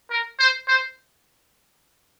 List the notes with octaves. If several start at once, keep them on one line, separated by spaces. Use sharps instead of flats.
A#4
C5
C5